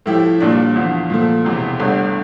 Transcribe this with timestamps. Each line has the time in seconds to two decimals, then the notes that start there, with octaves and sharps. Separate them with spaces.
0.06 A2 F3 A3 E4 G4
0.40 A#1 A#2 G3 D4
0.76 E2 D3 F3
1.10 A#2 F3 A3
1.45 E1 E2 C3
1.79 G1 G2 D3 A3